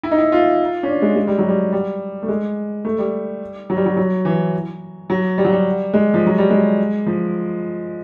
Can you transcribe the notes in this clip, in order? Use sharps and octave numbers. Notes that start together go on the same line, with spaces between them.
E4
D#4
E4
F4
C#4
D4
G#3
G#3
G3
F#3
G3
G3
A3
G#3
A3
G3
F#3
G3
F#3
F#3
E3
F#3
G3
F#3
G3
G#3
F3
F#3
G3
G#3
F3